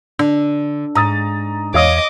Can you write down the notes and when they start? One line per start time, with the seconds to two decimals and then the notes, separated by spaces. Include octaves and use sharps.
0.19 D3 D4
0.95 G#2 A#5 D#6 A6
1.74 E2 C#5 D#5 F5 D6 D#6